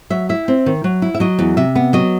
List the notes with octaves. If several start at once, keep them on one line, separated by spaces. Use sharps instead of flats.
F#3 E5
E4 E5
C4
D#3
F#3
E4
E5
F#3 D#5
E2
C3 E5
B3
F#3 D#5